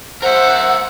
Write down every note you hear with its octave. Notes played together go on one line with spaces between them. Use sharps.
A#4 C5 E5 F#5